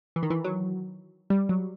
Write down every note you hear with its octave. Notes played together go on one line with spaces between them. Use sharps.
E3
D#3
E3
F#3
G3
F#3